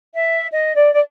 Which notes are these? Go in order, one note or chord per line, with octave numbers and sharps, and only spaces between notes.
E5
D#5
D5
D5